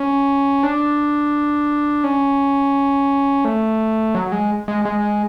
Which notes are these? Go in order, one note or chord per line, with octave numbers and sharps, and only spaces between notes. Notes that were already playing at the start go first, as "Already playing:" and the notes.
Already playing: C#4
D4
C#4
A3
F#3
G#3
G#3
G#3